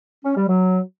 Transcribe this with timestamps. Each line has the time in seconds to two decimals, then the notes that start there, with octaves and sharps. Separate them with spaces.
0.25 C#4
0.36 G3
0.48 F#3